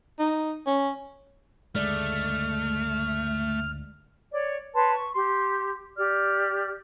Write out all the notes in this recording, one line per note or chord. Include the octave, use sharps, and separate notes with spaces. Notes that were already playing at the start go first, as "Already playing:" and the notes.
D#4
C#4
D2 G2 C#3 G#3 A3 D5 F6
C#5 D5
B4 C#5 A5 C6
C#6
G4 C6
G4 D5 F6